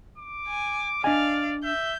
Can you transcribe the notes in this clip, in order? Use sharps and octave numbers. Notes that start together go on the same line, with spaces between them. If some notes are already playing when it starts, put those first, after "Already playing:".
D6
G#5
D4 D5 D#5 F5 G#5
E5 G6